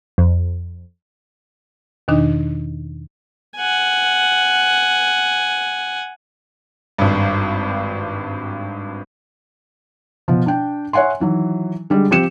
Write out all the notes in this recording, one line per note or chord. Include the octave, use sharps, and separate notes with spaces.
F2
E2 B2 D#3 D4 D#4
F#5 G#5
G#1 G2
B2 F3
D4 G5
C#5 E5 F#5 G#5 C6
D#3 E3 F#3
D3 G3 G#3
F3 C4 G4 C#7 E7